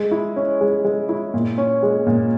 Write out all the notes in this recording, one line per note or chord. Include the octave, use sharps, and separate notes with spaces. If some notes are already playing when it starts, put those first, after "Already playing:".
Already playing: G#3
E4
C#4
G#3
G#3
E4
A#2
C#4
G#3
A#2